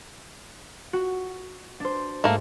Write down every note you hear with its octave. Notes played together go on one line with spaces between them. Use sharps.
F#4
D4 C5
G#2 A3 A#3